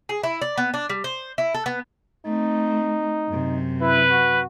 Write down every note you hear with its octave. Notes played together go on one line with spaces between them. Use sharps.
G#4
E4
D5
B3
D4
G3
C5
E4
A4
B3
A3 C4 D#4
F#2 C3
E4 B4
F#4